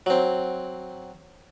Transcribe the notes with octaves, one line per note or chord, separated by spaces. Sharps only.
F#3 C4